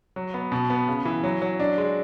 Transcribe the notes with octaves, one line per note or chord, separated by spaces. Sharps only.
F#3
B3
B2
B3
C#3
E3
F#3
F#3
D4
G#3